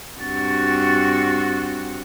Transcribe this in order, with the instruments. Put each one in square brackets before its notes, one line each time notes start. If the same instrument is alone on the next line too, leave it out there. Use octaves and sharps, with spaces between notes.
[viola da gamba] G2 C4 F#4 [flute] A6